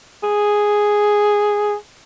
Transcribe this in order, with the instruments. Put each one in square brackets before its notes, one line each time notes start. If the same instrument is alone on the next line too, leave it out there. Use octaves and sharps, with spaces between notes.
[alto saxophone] G#4